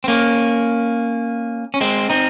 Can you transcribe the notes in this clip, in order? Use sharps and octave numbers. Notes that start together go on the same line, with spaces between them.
C4
A#3 C#4
C#4
G#3 C4
C4 D#4